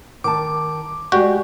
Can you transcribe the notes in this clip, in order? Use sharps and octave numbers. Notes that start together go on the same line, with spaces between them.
D#3 A5 D6
G#3 F#4 G4 D5